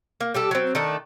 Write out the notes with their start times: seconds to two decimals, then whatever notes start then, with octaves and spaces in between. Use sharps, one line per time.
0.20 A#3
0.34 G3 G4 A4
0.51 F#3 C4
0.75 D#3 A3 D4 A4